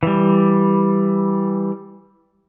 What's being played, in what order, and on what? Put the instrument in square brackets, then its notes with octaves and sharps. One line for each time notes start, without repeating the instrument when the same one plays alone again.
[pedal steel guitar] E3 G3